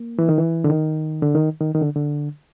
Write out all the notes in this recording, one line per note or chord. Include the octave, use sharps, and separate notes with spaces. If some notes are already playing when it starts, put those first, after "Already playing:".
Already playing: A#3
E3
D#3
E3
D3
D#3
D3
D#3
D#3
D#3
D3
D3